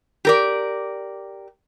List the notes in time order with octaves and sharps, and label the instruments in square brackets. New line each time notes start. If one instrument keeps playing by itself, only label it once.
[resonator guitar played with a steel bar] G4 A#4 D5